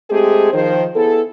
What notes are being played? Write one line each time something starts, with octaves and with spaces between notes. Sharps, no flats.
G#3 A3 C4 G4 G#4
D#3 F3 C5
B3 E4 G#4 A4